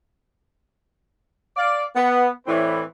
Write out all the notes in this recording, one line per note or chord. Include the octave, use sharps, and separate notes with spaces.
D5 F5
B3
A2 E3 C4 B4 C#5 D5